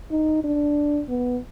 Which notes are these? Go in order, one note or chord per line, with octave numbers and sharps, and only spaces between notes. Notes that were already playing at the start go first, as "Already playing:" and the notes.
D#4
D4
B3